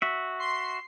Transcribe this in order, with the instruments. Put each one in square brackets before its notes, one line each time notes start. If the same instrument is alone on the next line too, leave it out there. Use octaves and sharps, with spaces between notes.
[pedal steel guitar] F#4 E5
[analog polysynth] C6 C7